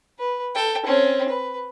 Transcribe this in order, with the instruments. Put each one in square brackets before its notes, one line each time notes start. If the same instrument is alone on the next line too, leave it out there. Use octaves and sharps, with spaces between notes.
[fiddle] B4
A4 G5
C4 C#4
B4